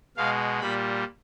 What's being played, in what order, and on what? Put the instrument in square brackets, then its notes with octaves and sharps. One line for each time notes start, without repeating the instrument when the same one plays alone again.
[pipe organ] B2 G#3 F5
A#2 G3 B5